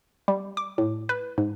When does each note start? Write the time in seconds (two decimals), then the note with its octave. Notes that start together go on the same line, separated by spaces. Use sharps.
0.28 G3
0.57 D6
0.78 A2
1.09 B4
1.38 G#2